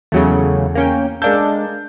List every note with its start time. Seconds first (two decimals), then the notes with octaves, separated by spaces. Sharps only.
0.12 E2 C#3 F#3 A3
0.75 A#3 C#4 G5
1.22 G#3 D4 A4 A#4 F5 G6